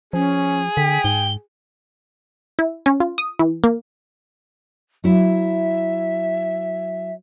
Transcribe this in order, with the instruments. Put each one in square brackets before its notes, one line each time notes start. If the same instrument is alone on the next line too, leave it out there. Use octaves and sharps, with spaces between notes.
[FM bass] F3 [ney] C#4 [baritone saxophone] G#4
[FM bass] D3 [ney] G5 [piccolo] B6
[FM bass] G#2 [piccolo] G7
[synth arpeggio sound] E4
C#4
F4
D#6
E3
A#3
[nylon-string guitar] F#3 E4 [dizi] E5